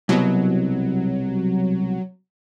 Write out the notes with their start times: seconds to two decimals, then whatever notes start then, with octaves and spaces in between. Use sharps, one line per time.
0.09 C2 B2 F#3